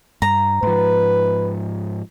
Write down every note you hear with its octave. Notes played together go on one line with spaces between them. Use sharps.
G2 A#5
G#2 F3 B4